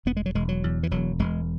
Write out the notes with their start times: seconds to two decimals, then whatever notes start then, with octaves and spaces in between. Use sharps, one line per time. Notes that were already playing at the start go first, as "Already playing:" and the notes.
0.06 E1 B3
0.17 G#3
0.26 F#3
0.35 E1 G#3
0.49 F#3
0.64 E2
0.83 E3
0.91 E1 F#3
1.19 E1 G#3